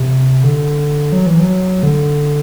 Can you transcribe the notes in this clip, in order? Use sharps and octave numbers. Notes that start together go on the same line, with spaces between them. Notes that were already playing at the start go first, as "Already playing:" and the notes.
Already playing: C3
D3
F#3
E3
F#3
D3